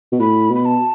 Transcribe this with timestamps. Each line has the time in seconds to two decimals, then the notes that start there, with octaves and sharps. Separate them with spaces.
0.12 B2
0.20 A2 B5
0.50 B2
0.55 B5
0.65 A5